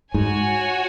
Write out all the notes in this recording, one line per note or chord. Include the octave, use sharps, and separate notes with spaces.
G#2 F#4 C#5 G#5